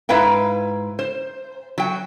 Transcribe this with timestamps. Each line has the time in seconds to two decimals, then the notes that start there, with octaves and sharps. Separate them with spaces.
0.09 G#2 E4 B4 F5 G5
0.99 C5
1.78 F#3 G5